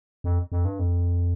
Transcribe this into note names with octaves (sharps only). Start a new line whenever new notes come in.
F2
F2
G2
F2